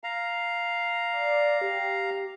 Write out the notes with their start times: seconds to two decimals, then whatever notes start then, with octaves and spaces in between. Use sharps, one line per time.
0.04 F5 A#5
1.13 D5
1.61 G4